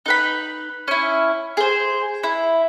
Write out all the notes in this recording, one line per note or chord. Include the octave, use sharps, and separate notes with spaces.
D#4 B4 B5
C#4 E4
G#4 C5
E4